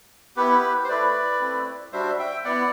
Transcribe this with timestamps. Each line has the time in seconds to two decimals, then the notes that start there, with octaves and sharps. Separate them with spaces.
0.36 B3 E4 G4 B4
0.84 C5
0.89 A3 E4 B4 D5
1.41 A3 C4 E4
1.92 G3 D4 F#4 C5 E5
2.19 E5 G5
2.44 B3 E4 D5 F#5